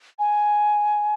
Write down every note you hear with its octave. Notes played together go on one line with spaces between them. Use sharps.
G#5